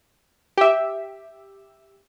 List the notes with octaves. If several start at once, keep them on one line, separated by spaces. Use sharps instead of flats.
G4 E5